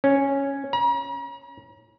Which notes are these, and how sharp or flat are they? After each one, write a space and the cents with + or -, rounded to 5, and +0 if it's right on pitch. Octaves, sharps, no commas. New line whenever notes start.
C#4 -5
A#5 +45